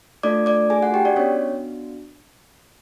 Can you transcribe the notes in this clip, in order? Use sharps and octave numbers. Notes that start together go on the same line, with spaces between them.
A3 D4 F4 A4 D5 D6
D5 D6
G#4 G#5
F#4 F#5
G4 G5
D4 D5
B3 C#4 D4 F#4 C#5